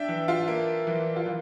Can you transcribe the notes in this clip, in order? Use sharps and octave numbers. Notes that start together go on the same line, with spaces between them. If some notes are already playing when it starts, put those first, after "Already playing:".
Already playing: D4 E5 G5
E3
F4
A#3
E3
F4
E3